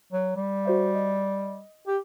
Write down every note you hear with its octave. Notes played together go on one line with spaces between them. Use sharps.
F#3
G3
F#4 C5 E5
D#5
G4